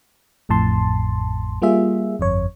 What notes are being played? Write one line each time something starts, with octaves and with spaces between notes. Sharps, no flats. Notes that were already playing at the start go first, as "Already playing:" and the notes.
A1 F2 A2 A5 C6
G3 A#3 F4 G#4 E5
G1 F2 C#5